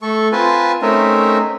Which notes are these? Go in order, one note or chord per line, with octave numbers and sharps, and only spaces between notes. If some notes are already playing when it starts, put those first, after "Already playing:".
A3 A4 C#6
C4 F4 B4 G#5 A5
A3 C4 C#4 D#4 A#4 E5